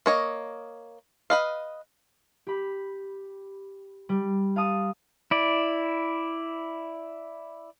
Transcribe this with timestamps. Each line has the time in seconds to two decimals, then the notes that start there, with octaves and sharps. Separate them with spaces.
0.06 A#3 C#5 D#5
1.30 B4 D#5 F5
2.47 G4 B5
4.09 G3
4.56 F5 A5 D#6
5.31 E4 D5